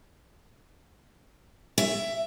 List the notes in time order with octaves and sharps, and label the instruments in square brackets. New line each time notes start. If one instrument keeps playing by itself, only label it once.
[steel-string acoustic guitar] E5